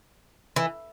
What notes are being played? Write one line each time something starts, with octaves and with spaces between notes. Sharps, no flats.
E3